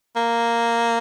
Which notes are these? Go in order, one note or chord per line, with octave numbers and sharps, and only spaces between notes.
A#3